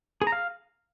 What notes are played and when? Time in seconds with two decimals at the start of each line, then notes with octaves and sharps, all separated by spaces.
0.22 G#4
0.27 A#5
0.32 F5